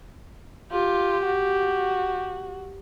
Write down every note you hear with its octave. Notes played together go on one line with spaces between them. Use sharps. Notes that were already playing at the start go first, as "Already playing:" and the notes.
F4 G4
F#4